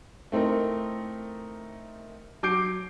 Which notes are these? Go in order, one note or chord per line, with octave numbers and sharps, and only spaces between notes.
A3 C4 D#4 E4 A#4
F#3 D6 G6 C7 D7